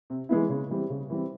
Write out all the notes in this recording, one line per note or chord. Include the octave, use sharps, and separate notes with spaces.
C3
E3 G#3 B3 E4
C#3
E3 G3 C4
C#3
E3 G3 C4